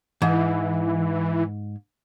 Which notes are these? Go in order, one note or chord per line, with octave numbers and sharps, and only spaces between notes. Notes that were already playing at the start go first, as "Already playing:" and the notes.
G#2 E3